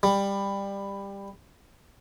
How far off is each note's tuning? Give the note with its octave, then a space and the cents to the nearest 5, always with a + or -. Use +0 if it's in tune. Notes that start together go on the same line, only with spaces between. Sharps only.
G3 +15